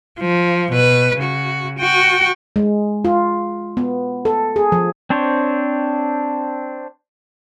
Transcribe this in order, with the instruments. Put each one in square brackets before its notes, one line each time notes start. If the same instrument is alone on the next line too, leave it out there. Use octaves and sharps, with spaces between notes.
[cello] F3
B2 B4
C#3 F#4
F#4 G5
[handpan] G#3
F4
B3
A4
G#4
F3
[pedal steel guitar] C4 D4 C5 C#5